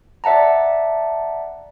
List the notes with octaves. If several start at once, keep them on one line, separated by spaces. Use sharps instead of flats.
D5 E5 F#5 A5 A#5